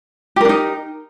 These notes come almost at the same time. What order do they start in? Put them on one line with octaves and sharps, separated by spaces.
G4 A#4 D4 D#4